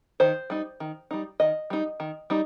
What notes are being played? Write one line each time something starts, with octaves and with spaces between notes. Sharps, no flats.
D#3 C5
G3 D#4
D#3
G3 D#4
D#3 D#5
G3 D#4
D#3
G3 D#4